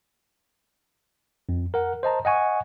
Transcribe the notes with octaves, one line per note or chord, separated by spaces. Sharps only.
F2
A#4 F#5
C5 D#5 A5 A#5
D#5 F#5 G#5 C#6